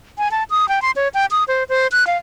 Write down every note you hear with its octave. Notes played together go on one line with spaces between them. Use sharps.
G#5
A5
D#6
G5
C6
C#5
G5
D#6
C5
C5
F#6
F5